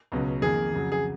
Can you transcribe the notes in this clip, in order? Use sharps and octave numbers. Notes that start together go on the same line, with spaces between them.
C#2 B2 F#3 C#4
F2 D#3 A#3 G#4
F2 C#3 F#3
G#4